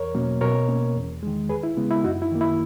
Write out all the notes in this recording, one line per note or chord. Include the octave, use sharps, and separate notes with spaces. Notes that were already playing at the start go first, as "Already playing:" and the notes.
Already playing: E2 A#4 C#5
B2 F#3 A#3 C#4
B2 A#4 C#5
A#3 C#4
E2
D#3 G#3
D#2 G#4 B4
E4
C#3 G#3 B3
E4
F#2 D#4 F#4
E4
D#3 A#3
E4